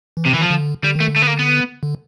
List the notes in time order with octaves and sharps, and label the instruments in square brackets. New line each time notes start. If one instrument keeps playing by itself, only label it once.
[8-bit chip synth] E3
[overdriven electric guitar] C3
[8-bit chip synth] D#3 [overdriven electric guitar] E3
[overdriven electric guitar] F3
[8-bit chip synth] D3
[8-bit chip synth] D3 [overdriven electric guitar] G3
[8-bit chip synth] D#3 [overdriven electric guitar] A3
[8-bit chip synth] D3
[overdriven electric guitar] A3
B3
A#3
B3
[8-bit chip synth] D3